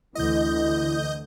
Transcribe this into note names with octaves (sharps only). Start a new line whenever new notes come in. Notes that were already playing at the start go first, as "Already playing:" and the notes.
D2 D3 E3 E4 D#5 G6